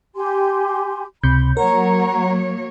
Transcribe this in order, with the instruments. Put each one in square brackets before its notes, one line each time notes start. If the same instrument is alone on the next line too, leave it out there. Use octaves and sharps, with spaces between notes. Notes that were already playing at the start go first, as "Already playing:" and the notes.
[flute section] G4 G#5 C6
[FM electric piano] C#2 C3 G6 [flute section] B5
[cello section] F#3 A#3 C#5 [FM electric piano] A#4 [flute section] F#5 A#5